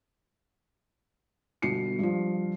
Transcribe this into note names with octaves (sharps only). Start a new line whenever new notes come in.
G1 B2 C7 C#7
G2 F3